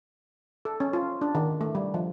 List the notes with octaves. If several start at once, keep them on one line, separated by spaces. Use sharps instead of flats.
A4
C#4
F4
D4
D#3
A3
G3
F3